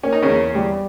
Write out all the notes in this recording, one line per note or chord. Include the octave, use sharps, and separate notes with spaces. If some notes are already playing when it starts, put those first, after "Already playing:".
A#3 C#4
D#4
C#3 C#4
E2
G3